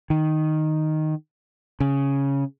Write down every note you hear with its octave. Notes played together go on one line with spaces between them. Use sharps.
D#3
C#3